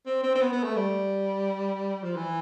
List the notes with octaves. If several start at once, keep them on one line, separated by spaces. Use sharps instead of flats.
C4
C4
C4
B3
B3
A3
G3
F3
E3